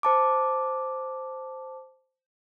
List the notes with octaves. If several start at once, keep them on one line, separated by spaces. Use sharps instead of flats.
C5 A5 D6